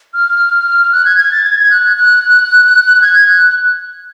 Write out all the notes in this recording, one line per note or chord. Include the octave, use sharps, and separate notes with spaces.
F6
F#6
G#6
G#6
A6
G#6
F#6
F#6
G#6
F#6